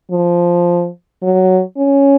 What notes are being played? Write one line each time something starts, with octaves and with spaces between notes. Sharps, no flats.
F3
F#3
C#4